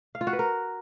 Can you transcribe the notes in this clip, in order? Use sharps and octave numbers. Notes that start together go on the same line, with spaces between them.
F5
F4
F#4
B4
A#4